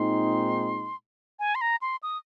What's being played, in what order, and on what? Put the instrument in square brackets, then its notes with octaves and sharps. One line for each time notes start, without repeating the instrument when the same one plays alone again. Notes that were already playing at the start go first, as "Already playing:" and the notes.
Already playing: [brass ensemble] A#2 G#3 C4 D#4 [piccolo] C6
[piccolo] G#5
C6
A#5
C6
D#6